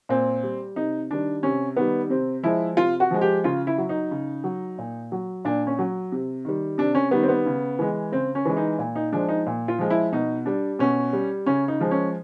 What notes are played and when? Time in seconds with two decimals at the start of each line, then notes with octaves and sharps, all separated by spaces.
0.09 A#2 C4
0.43 G3
0.76 C3 D#4
1.11 D#3 G3 D4
1.43 C3 C#4
1.77 D#3 G3 B3
2.10 C3 C4
2.43 F3 G#3 E4
2.77 C3 F4
3.00 F#4
3.11 F3 G#3
3.21 G4
3.44 C#3 F4
3.67 E4
3.78 F#3
3.89 D#4
4.11 C#3
4.44 F#3
4.78 A#2
5.12 F#3
5.45 A#2 D4
5.67 C#4
5.79 F#3
6.12 C3
6.45 D#3 G3
6.78 C3 D4
6.95 C#4
7.11 D#3 G3 B3
7.23 C4
7.29 B3
7.46 C#3
7.79 E3 G#3
8.12 C#3 C4
8.35 C#4
8.45 E3 G#3
8.57 D#4
8.79 A#2
8.96 D#4
9.12 F3 G#3 D4
9.29 D#4
9.47 A#2
9.68 F4
9.79 F3 G#3
9.90 E4
10.12 B2 D#4
10.46 G3 D4
10.79 B2 C#4
11.13 G3
11.46 C#3 C#4
11.68 D#4
11.81 F3 G#3
11.91 C#4